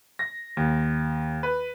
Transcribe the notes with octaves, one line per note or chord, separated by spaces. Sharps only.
A#6
D#2
B4